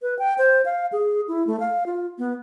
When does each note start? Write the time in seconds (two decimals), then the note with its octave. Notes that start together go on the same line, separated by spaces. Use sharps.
0.02 B4
0.19 G5
0.38 C5
0.65 F5
0.92 G#4
1.28 E4
1.47 A3
1.60 F5
1.86 F4
2.18 B3